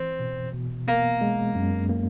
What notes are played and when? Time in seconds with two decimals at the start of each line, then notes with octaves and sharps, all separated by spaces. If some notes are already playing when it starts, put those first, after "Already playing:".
Already playing: E3 C4
0.20 B2
0.54 B2
0.88 A#3 B3
1.21 G#3
1.55 F#2
1.89 A#3